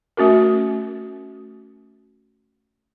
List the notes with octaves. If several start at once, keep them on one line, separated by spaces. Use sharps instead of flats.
A3 C#4 F#4 A#4